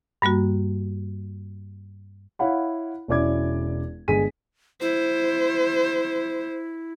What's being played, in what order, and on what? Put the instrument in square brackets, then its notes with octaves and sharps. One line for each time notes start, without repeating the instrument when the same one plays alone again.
[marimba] G2 G3 A#3 F#4
[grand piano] E4 C#5 F5 F#5 B5
E1 C#4 E4 D5 D6 G#6
G1 G#3 G#4 B6 D#7
[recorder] E4 [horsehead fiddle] C5